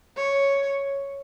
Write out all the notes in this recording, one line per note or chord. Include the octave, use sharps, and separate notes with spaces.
C#5